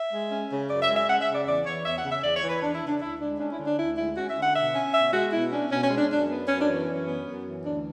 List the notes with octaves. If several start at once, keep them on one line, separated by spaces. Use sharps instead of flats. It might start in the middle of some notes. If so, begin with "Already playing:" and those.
Already playing: E5
G#3
C#4
C#3
F#2 D5
E5
G#3
E5
C#4 F#5
E5
C#3
D5
E2 D5
E3 C#5
E2 E5
F#5
C#3
E5
E2 D5
C#5
E3
B4
E2 D4
E4
C#3
D4
D2 E4
G#3 D4
C#4 D4
E4
D3
D4
D2 E4
G#3 E4
C#4 F#4
E5
D3
F#5
B2 E5
C#4
B2 E5
G#3 F#4
B2 E4
C#4 D4
B2 C#4
C#4
G#3
D4
F#2 D4
B3
F#2 C#4
D4
E3
C#4
F#2
B3
F#2
E3
D2 D4